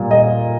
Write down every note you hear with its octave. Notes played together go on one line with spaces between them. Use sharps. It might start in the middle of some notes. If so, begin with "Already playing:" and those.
Already playing: A#2 G3
D#5